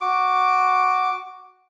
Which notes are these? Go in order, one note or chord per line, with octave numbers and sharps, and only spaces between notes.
F#4 D6